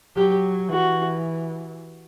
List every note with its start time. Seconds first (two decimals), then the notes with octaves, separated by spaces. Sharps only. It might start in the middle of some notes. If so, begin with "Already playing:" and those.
0.16 F#3 G4
0.70 E3 F#4